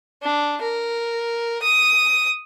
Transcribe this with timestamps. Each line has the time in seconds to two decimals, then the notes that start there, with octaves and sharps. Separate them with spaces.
0.23 D4
0.62 A#4
1.62 D#6